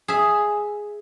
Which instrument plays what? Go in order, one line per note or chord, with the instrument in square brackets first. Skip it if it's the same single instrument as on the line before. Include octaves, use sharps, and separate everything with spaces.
[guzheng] G#4 E5